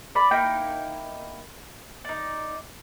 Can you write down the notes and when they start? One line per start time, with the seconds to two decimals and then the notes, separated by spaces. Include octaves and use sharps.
0.15 D5 B5
0.31 A#3 D#4 E4 G5
2.05 D#4 D5